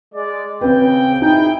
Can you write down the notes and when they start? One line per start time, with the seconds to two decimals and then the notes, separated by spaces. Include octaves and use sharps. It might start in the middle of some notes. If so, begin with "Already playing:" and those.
0.15 G#3 D5
0.61 C#3 C4 B4 G5
1.22 D#4 E4 G#4 G5